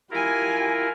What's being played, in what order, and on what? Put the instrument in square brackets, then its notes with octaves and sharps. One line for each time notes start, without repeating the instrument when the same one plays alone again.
[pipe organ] E4 F4 A#4 [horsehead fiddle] G4 G#5